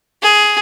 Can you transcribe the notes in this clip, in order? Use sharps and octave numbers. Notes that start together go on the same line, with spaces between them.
G#4